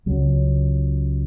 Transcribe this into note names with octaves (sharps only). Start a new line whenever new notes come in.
C#2 C#3 F#3